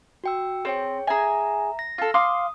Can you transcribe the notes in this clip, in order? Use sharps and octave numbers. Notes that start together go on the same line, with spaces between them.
F#4 G5 E6
C4 G#4 C#5 G5
G#4 E5 G#5 A#5
A#6
F4 A4
F5 C6 D6 D#6